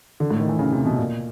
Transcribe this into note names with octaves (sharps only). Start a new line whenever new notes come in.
D3
A2
D#3
E3
C#3
C3
B2
A#2